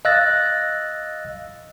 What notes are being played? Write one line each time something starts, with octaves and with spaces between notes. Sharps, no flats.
D#5 F5 E6 F#6 A6 A#6